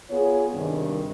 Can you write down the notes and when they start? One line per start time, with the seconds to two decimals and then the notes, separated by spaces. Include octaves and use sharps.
0.10 B3 F4 G#4 C#5
0.54 G2 C3 D#3